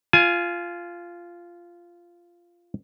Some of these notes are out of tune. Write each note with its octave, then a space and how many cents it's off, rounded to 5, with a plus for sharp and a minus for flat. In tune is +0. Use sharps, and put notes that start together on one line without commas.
F4 -10 G#5 +20